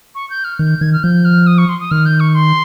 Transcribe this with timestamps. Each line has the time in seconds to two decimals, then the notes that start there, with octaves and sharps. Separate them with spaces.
0.15 C#6
0.30 G6
0.44 F6
0.59 D#3 G6
0.81 D#3 G#6
0.93 F6
1.04 F3 G6
1.25 F6
1.47 D#6
1.58 C#6
1.69 C6
1.80 D#6
1.91 D#3 F6
2.06 G6
2.20 C#6
2.35 C6